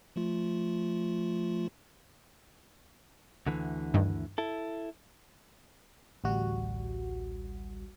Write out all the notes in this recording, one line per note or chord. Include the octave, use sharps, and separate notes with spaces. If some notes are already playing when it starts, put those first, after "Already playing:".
F3 A3 F4
D2 D3 E3
G2 D#3
E4 A4
A1 D2 G3 F#4